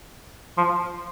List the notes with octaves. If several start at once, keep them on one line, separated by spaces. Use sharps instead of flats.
F3